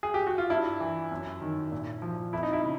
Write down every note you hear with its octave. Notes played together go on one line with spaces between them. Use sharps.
G#4
G4
F#4
F4
G2 E4
E3
F#2
D#3
A#2
F3
F2 E4
D#4
E4
C#3